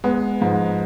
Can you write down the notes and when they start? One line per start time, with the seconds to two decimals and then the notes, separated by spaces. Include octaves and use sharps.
0.04 G#3 B3
0.41 G#2 F3